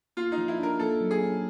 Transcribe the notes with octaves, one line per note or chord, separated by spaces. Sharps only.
A#3 F4
D#4
F3
E4
D4 A#4
A#3 A4
F#3
G#4
C#4